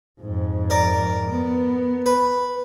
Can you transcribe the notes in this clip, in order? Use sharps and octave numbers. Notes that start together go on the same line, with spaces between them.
F2 G#2
A#4 D5
B3
B4